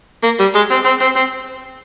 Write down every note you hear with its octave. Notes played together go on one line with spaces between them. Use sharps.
A#3
G3
G#3
C4
C4
C4
C4